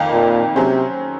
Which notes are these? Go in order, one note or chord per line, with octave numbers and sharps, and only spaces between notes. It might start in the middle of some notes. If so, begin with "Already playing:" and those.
Already playing: F2 D#3 A#3 D#4
A#2
C3 F#3 C#4 G#4 C5